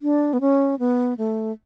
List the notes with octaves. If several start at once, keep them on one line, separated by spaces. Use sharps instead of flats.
D4
B3
C#4
B3
A3